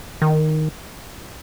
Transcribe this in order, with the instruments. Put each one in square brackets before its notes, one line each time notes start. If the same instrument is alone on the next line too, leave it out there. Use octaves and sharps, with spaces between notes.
[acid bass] D#3